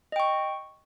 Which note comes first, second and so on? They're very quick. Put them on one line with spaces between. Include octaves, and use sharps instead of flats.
D#5 G5 C#6